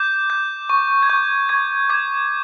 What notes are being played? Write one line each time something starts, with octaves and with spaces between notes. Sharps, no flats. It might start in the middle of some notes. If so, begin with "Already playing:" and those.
Already playing: D6 G6
G6
C#6
G#6
C#6 G6
C#6 G#6
D6 G#6